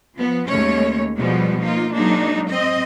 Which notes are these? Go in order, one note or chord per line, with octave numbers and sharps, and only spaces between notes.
F3 B3
D#2 G#3 A3 C#4 C#5
B2 F3 G3 G#3 B3
A#3 D#4 F4
F#3 G#3 A#3 D4 D#4
C4 D#5